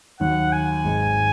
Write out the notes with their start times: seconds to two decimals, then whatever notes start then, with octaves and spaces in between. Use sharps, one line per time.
0.20 D#2 D#3 F#3 F#5
0.52 G#5
0.84 G#1 G#2 D#3 G#3 D#4